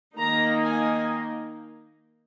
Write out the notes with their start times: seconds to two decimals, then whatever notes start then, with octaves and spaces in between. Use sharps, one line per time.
0.17 D#3 A#3 D#4 A#5
0.64 G#5